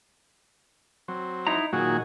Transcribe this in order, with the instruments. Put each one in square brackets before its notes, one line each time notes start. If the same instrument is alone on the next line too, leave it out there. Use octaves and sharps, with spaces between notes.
[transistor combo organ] F#3 C4
[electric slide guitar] D#4 E4 A#5
[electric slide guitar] A#2 D#3 [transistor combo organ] F#3 F#4 G#4